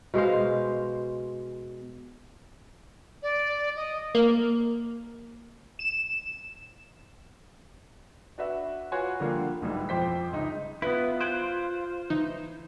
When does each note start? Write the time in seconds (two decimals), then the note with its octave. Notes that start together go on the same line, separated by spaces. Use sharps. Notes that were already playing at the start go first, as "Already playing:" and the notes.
0.14 B2 G#3 C5 F5
3.23 D5
3.76 D#5
4.15 A#3
5.79 E7
8.38 D4 F#4 B4 E5
8.92 F4 F#4 B4 C#5 G#5 C6
9.20 D3 F3 G3 A#3 F4
9.62 B1 G#2 B2 E3 G3
9.89 F2 F3 C5 G5 D6 B6
10.32 G1 C#2 G#3 D#4 D#6
10.82 B3 E4 F4 B4
11.21 C5 F#6 G#6 D7
12.10 E3 D#4